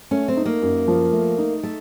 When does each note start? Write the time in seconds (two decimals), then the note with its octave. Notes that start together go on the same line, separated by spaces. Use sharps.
0.11 A3 C#4
0.28 C4
0.37 D#4
0.45 A#3
0.62 F#2
0.88 F3
1.13 A3
1.38 D#4
1.63 A3